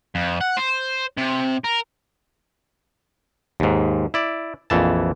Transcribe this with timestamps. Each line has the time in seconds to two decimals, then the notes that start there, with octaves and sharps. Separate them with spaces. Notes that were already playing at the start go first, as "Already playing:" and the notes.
0.15 F2
0.41 F#5
0.57 C5
1.17 C3
1.64 A#4
3.60 D#2 G#2
4.14 E4 D5
4.70 A#1 F2 E3 A5